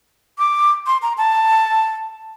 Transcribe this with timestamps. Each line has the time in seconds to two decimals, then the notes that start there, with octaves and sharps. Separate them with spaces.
0.39 D6
0.87 C6
1.02 A#5
1.18 A5